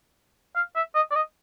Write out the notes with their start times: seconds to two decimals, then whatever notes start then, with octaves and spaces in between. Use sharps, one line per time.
0.56 F5
0.76 E5
0.95 D#5
1.11 D5
1.15 D#5